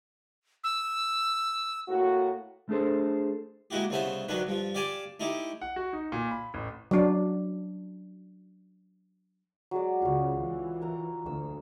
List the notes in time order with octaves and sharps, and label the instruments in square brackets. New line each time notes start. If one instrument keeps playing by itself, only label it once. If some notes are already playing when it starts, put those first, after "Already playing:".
[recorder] E6
[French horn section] A2 A#3 F#4
[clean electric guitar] A3 D4 G#4 A4 C5
[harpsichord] G#3 A#3 E4 F#4 G4
C2 C#3 A3 B3 C5 E5
D2 D#3 F#3 D4 B4
G2 F3
G4 D5 F5 G#5 A5
A3 D#4 E4 G4
[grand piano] F#5
F#4
D#4
A#2
B5
A1
[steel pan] F#3 D4
[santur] F#3 G#3 D5
[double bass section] C#2 C#3 [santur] F4 C#5
[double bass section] E3
[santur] A#4 A#5
[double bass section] D2 [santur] E6